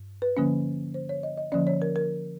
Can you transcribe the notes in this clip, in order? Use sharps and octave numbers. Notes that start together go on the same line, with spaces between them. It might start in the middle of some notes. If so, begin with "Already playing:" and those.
Already playing: G2
B4
D3 F3 A#3 C#4
C5
C#5
D#5
D#5
D3 F3 A#3 C#4 D5
C#5
A#4
A#4